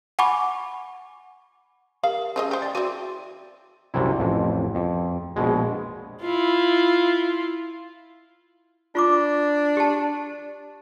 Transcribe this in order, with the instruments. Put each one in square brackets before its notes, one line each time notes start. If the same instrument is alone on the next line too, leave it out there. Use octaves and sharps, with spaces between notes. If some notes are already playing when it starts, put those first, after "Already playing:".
[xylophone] F#5 G#5 B5 C#6 D6
[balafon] G4 A#4 [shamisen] F5
[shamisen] F3 G#3 D#5 [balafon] C#4 G#4
[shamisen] G4 C5
[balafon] D5 G5
[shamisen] C4 E4 [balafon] F#4
[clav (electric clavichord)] C2 F#2 C3 E4
A1 F2
F2
A#1 B2 G#3
[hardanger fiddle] E4 F4
[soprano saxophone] D4 [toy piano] F4 C#6 D6
[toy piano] G4 A5